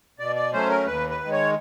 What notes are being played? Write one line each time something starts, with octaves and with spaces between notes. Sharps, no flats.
B2 D5
D5
F#3 A3 C#4 C5
A#4
D#2 B4
B4
D#3 G#3
C#5